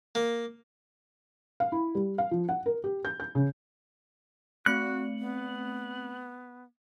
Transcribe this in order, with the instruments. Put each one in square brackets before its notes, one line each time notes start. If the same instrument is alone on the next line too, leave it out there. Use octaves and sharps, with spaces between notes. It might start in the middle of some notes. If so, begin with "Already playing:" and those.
[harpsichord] A#3
[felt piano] F5
E4
G3
F5
F3
F#5
A#4
G4
G6
G6
C#3
[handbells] A3 C4 C#7 [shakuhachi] F#4 [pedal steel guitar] F#6
[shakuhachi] B3